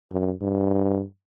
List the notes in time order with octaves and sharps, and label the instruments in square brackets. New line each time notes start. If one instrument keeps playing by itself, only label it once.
[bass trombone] F#2
G2